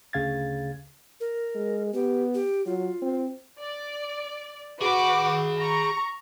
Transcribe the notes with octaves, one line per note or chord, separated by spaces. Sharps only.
D2 C#3 F5 G#6 A6
A#4
G#3
B3 G4
G4
F#3 F4
C4
D5
F#4 G#4 B4 B5 D6
A#5 C#6